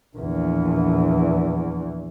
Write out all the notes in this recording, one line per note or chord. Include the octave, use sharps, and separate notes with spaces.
A#1 E2